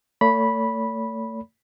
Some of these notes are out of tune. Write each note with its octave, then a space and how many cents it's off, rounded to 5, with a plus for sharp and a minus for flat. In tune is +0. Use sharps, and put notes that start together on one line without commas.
A3 +35 C#5 +45 B5 -10